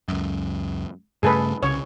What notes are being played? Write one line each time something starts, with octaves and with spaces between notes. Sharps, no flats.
C#2 F#2
G2 C#3 A3 G#4 A4 B4
C2 C#3 C#5